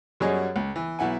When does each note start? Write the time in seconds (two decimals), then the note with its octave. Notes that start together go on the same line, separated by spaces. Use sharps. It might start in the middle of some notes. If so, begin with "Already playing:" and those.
0.20 F#2 F#3 G3 G#4 C#5 D#5
0.56 C#2
0.76 E3
0.99 B1 E4 F#5 G#5